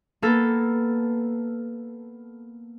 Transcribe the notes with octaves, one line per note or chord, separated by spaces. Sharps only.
A#3 B3 A4